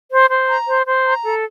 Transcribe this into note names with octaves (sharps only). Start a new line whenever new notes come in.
C5
C5
A#5
C5
C5
A#5
A4